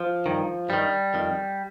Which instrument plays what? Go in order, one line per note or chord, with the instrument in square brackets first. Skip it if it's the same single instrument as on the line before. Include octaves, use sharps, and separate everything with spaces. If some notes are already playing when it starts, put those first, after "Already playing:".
Already playing: [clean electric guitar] F3
G2 D#3
G2 D#3 G3
F2 D#3